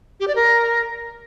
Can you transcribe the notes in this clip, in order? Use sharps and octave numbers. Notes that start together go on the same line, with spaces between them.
G4
D5
A#4